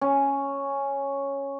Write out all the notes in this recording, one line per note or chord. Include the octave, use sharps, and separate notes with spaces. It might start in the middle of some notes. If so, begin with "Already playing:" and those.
C#4